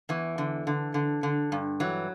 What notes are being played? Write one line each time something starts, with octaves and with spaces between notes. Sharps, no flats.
E2 E3
D3
D3
D3
D3
G2
E3 F#3